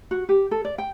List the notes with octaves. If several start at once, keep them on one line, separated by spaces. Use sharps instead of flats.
F#4
G4
A4
D5
G5